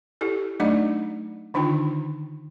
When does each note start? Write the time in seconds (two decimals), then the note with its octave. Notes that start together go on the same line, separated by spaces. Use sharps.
0.21 E4 G4 A4
0.60 F#3 A3 D4 D#4 D5 D#5
1.54 D3 D#3 D4 D#4 F4 G5